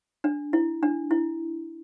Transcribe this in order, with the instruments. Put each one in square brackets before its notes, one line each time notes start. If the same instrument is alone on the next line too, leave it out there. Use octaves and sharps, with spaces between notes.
[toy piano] D4
E4
D4
E4